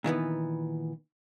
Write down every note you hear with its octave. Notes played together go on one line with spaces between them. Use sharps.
A#2 D#3 E3 B3